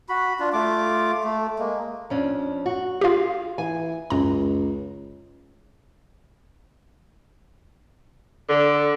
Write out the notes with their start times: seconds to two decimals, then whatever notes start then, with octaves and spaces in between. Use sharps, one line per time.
0.09 F#4 B5
0.40 D4 F4
0.53 A3 F4 D6
1.24 A3
1.59 G#3 A#3
2.10 F2 C#4 D4
2.66 F#4
3.01 F4 G4 G#4 F5
3.58 E3 G#5
4.10 C#2 F#2 A#5
8.49 D3